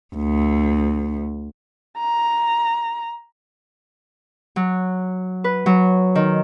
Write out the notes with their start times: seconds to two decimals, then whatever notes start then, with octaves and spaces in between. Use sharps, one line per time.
0.16 D2
1.98 A#5
4.56 F#3
5.44 B4
5.66 F#3
6.15 D#3